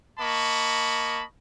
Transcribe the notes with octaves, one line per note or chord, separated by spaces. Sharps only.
A#3 D#5 A5 B5 C#6